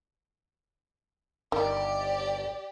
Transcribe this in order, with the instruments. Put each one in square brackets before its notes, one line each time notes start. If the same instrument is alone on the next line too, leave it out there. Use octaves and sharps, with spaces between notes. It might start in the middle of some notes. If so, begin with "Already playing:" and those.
[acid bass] G1 [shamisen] D#3 [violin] G4 D5